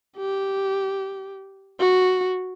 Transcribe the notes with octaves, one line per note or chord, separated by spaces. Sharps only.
G4
F#4